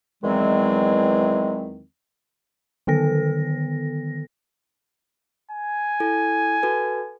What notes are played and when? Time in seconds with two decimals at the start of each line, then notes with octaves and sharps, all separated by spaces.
0.23 E2 D#3 E3 F#3 G#3 C4
2.87 D3 D#3 B3 A4 A#6
5.51 G#5
6.00 E4 A4
6.63 F#4 A4 B4